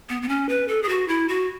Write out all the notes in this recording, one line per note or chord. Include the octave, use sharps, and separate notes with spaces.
B3
B3
C#4
B4
A4
G#4
F#4
E4
F#4